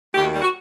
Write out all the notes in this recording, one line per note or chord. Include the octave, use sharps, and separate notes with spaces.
D#2 D#3 A3 G4
F#4
G3 G4
F#4